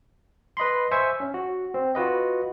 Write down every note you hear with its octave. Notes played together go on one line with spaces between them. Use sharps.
B4 D#5 B5 C6
C5 E5 G#5 C#6
C#4
F#4
C4
F4 F#4 B4 D#5